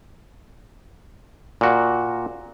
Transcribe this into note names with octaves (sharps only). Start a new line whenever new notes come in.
A#2 F#4